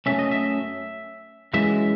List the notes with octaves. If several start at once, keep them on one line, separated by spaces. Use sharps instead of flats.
F#2 E3 A3 C#4 E5
D#5
E5
F#2 E3 G#3 E5